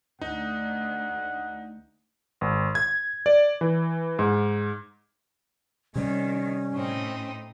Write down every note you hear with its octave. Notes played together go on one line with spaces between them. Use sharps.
D2 D#4 F#5
G#1
G#6
D5
E3
G#2
C3 D#3 G3 C#4
A2 C4 D#4